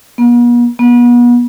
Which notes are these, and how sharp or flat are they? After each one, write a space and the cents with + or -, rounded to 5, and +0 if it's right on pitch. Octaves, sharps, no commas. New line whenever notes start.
B3 -45
B3 -35